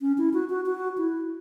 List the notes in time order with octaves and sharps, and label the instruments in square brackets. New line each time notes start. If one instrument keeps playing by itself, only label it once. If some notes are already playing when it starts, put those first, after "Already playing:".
[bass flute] C#4
E4
F#4
F#4
F#4
E4